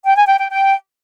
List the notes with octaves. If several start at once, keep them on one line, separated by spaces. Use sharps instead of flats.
G5
G#5
G5
G5
G5